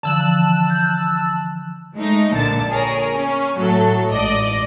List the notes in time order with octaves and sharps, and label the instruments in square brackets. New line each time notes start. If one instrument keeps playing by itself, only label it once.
[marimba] D3 E3 F3 [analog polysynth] A5 E6 F#6
[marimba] G6
[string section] G#3 A3 D#4
A#1 A#2 D3 A5 A6
G#4 A#4 C#5
C#4
A2 F#3 A4
A1 G#2 D5 D#5